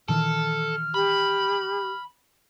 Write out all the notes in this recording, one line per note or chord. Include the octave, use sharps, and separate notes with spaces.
A#2 D#3 E3 A4 F6
G4 B5